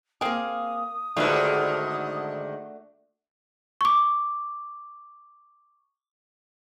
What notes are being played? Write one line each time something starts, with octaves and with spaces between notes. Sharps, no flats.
A#3 C4 G#4 F5 D#6
G#2 D3 D#3 A3 D4 F4 F#4 B4
C#6 D6